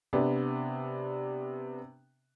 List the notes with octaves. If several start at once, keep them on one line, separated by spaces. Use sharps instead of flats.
C3 B3 D4